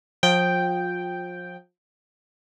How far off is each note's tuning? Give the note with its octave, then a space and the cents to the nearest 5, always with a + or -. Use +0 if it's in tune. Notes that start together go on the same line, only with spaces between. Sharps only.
F3 +30 G5 +0